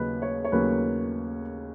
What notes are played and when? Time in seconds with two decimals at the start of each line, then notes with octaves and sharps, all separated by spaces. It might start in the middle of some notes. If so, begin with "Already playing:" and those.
Already playing: D#2 C#3 F#3 A#3 C#4 B4 D#5
0.22 C#5
0.44 C#5
0.52 D#2 C#3 F#3 A#3 C#4 B4